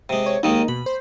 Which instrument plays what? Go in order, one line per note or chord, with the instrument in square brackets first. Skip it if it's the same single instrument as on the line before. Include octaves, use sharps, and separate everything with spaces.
[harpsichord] C3 G#3
[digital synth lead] C#5
[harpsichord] D#2 D#3 G#3 [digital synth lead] D#4
[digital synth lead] B2 [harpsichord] B5
[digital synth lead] C5